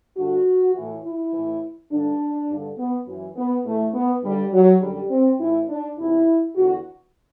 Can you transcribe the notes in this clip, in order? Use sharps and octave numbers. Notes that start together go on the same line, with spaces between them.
G2 D3 F#4
E3
A2
E4
A2 E3
G2 D3 D4
G2 D3
B3
F#2 E3
B3
A2 E3 A3
B3
G2 D3 G3
F#3
F#2 D3 G3
C4
A2 E3 E4
D4
E2 C3 E3 E4
E2 D3 F#4